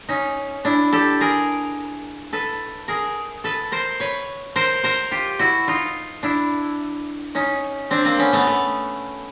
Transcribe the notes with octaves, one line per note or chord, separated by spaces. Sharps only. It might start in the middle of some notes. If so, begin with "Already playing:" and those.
C#4 D#4
D4 E4
G4 A4
G#4 A#4
A4 B4
G#4 A#4
A4 B4
A#4 C5
B4 C#5
A#4 C5
A#4 C5
F4 G4
E4 F#4
D#4 F4
D4 E4
C#4 D#4
C4 D4
A#3 C4
B3 C#4
A3 B3
A3 B3